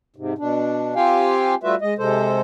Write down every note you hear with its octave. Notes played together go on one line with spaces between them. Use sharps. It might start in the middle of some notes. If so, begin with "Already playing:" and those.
G#2 C3
B2 D4
C4 F4 G4 F5 G5 G#5
G3 A3 F4 F#4 B4 E5
G#3 D#5
C3 G#3 A4 C5